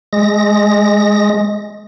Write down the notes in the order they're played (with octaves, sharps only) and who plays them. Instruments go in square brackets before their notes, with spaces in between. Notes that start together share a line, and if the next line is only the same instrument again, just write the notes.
[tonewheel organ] G#3 A#6